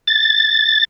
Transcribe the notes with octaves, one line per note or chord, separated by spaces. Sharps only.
A6